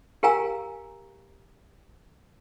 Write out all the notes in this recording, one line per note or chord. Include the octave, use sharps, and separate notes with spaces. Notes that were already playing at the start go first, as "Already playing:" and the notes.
G4 A#4 F5 G#5 A#5 E6